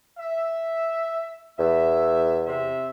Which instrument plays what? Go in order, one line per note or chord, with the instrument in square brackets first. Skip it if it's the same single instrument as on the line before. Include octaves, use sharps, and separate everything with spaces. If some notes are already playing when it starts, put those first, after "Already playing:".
[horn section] E5
[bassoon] E2 [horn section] E5
[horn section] C3 C5 E5